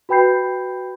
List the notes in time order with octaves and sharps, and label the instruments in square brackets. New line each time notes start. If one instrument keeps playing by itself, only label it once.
[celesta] F#4 B4 G5 B5 G6 C7